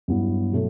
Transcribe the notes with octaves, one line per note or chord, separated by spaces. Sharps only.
G2 F#3 B3 E4
B2 F#3 A3